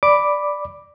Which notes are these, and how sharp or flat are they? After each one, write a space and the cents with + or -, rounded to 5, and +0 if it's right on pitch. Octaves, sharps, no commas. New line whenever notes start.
D5 +0 B5 +0 D6 +0